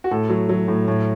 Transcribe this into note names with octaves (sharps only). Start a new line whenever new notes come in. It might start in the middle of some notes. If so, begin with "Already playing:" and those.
F#4
A2 A4
F#3
F#3
A2
A2